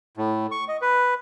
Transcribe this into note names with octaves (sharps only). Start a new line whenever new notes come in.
A2
C#6
D#5
B4